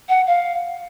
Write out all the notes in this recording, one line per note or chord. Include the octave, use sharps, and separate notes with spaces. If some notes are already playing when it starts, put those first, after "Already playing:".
F#5
F5